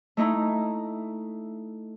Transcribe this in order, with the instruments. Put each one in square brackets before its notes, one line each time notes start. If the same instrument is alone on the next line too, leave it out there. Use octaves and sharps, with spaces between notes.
[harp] A3 D#4 E4 A#5